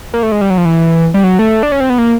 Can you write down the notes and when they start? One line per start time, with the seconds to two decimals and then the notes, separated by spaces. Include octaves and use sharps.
0.14 A#3
0.23 A3
0.32 G#3
0.41 G3
0.50 F#3
0.57 F3
0.65 E3
1.14 G3
1.24 F#3
1.39 A3
1.63 D4
1.72 C#4
1.80 C4
1.90 B3
1.98 A#3